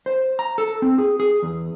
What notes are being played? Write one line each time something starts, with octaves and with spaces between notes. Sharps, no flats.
C5
A#5
A4
C4
G#4
G#4
E2